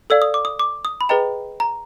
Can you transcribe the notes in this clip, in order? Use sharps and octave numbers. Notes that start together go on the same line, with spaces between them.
A4 D5 F5 E6
D#6
D6
D#6
D6
D#6
B5
G#4 B4 D#5 G5 A#5
A#5